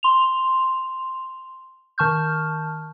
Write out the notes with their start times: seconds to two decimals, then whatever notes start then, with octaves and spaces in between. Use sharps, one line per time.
0.03 C6 F7
1.98 D#3 A5 C#6 F6 G6